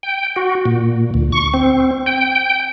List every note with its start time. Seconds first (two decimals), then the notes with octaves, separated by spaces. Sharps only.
0.03 G5
0.36 F#4
0.65 A#2
1.14 D2
1.32 C#6
1.54 C4
2.06 G5